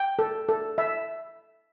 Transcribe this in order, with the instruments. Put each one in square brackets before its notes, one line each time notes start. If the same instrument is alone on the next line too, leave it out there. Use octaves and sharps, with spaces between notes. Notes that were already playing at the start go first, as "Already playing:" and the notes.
Already playing: [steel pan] G5
A4
A4
E5